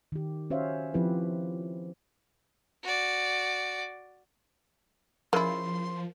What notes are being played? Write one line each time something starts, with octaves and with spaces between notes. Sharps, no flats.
D#3 G4
C#4 F#4 C5 C#5 E5 F5
F3 C4 E4 G4 B4
F#4 D5
C#3 F3 E4 A#4 D#5 C6